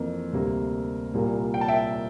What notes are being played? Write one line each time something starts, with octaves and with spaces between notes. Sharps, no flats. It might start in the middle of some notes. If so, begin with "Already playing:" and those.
Already playing: F2 E3 A#3
D2 C3 G3 A#3
C2 A#2 G3 A#3
G5
A5
E5 G5